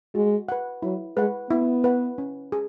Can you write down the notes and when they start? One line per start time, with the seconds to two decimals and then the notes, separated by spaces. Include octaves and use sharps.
0.15 G#3 F#4
0.49 B4 F#5
0.82 F#3 E4
1.16 G#3 B4 F#5
1.50 B3 E4
1.84 B4 F#5
2.18 C#4
2.52 G#4